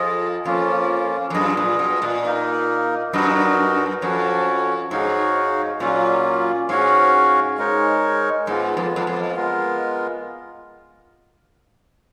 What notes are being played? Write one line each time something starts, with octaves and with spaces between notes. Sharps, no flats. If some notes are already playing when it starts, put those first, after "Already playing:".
Already playing: F2 F4 G#4 D#5
F2 A#3 C#4 F4
F2
F#2 F4 G#4 D#5
A#2
B2
A#2
A#3 D#4 A#4
F#2 D#4 F#4 A#4 D#5
F2 C#4 F#4 C#5
G#2 D#4 F#4 C#5 F5
A#2 F#3 A#3 C#4 F4
G#2 C#4 F#4 C#5 F5
G#3 D#4 A#4 C#5
G#2 G#3 B3 F4
F2
F2
F2
G#3 B3 F4 A#4